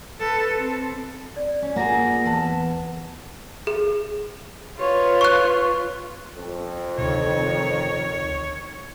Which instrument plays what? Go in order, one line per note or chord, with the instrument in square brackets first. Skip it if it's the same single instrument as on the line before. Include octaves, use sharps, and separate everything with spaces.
[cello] A4 B4
C4 A4
[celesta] D5
[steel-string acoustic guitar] C#4
[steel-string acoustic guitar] A#3 F4 G#4 [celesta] F#5 A#5 A#6
[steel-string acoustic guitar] E2 B4 A5
[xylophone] G#4
[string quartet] F4 B4 C#5
[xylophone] C#6 F#6
[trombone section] F2
[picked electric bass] D2 C3 [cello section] D#3 [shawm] C#5